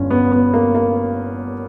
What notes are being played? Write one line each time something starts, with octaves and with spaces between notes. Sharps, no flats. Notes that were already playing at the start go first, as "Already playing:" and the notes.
Already playing: G1 G2 C#4
B3
B3
A#3
A#3